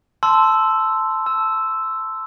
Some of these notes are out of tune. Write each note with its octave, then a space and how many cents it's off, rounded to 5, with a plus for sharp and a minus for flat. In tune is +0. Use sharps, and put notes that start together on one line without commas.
A5 +0 C6 -10 E6 +0
A5 +0 E6 +0